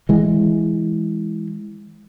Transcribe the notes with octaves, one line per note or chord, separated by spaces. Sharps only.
E3 G#3